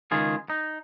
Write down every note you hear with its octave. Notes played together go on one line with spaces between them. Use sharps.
C#2 D#3 F4 G#4
D#4